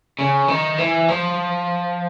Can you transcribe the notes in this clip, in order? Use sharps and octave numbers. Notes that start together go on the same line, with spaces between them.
C#3
D#3
E3
F3